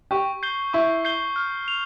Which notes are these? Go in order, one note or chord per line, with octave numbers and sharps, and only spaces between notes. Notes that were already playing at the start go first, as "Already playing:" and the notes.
G4 C#6
G6 C7 G7
E4 C#6
G6 C7 G7
F6
F7